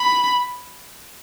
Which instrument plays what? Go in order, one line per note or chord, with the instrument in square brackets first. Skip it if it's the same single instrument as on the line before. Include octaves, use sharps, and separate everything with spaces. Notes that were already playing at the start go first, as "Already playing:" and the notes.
Already playing: [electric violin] B5